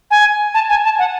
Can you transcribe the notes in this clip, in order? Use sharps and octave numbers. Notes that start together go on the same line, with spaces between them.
G#5
A5
G#5
A5
F#5